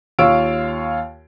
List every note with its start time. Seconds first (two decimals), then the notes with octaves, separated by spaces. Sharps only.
0.19 D#2 F4 C#5 F5 E6 D7